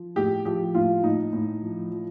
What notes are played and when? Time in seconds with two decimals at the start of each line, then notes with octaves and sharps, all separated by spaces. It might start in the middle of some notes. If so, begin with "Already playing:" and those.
Already playing: F3
0.16 A2 G4
0.45 F3 G4
0.75 A2 F4
1.03 A2 D#4
1.33 A2
1.62 F3
1.91 F3